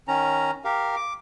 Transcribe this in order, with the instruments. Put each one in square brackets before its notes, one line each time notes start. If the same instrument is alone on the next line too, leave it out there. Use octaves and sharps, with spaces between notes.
[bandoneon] D#3 C#4 A#5
G4 A#4 F5
D6